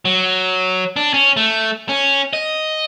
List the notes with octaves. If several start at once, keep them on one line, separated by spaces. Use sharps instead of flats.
F#3
D4
C#4
A3
C#4
D#5